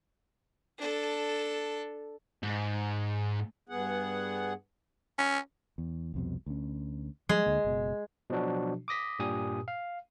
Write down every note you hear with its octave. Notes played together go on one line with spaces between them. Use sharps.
D4 A4
G#2
G2 B3 G#4 F#5
C#4
E2
C2 F2 B2
D2 C#4
F3 G3 G#3
D2 D3 A#3
F#1 B2
B2 F3 F#3 D4 F#4
D6 D#6 A#6 B6
G2 A#2 G4 G#5 D#6
F5